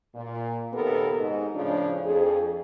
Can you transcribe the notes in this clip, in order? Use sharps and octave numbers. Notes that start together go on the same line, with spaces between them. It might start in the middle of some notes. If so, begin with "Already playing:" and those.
A#2
D#2 C3 B3 G4 A4 A#4
G#2 D#5
A2 C#3 F3 D4
F2 G#4